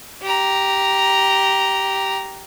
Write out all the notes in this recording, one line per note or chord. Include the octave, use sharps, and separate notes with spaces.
G4 A#5